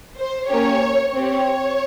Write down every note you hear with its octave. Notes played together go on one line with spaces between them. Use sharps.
C5
A#3 C#4 G4 C#5
C4 G4 C#5